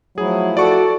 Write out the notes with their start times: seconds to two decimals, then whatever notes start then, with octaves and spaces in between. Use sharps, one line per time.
0.18 F3 F#3 A3 E4 G#4
0.57 F#4 A4 D5 C#6